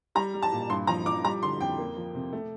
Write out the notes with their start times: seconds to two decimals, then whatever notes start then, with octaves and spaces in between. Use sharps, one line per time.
0.15 G3 A#5
0.34 G3
0.42 A5
0.52 A#2
0.69 G2 C6
0.87 F3 A#5
1.06 F3 D6
1.24 G3 A#5
1.42 D3 C6
1.60 F2 G5
1.78 A#3
1.97 F3
2.15 C3
2.33 A3